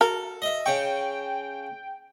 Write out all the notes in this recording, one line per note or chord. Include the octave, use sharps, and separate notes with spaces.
F#4 A4 A#4
D#5 E5
C#3 G5 C#6